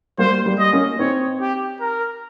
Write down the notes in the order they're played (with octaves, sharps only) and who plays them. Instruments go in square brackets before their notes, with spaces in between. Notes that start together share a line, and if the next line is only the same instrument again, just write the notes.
[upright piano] G3 A#3 [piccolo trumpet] C5
[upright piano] G3 A#3
[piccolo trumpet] D#5
[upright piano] A#3 C#4
[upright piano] C4 D#4 [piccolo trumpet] C#5
[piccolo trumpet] G4
A#4